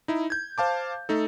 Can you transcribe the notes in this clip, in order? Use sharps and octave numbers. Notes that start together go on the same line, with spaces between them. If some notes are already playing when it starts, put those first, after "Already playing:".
D#4 E4
G6 G#6
C5 F5 A5 D6
A3 D#4 A4